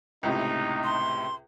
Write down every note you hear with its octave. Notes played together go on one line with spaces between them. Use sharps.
C#2 A2 C3 D#4
C6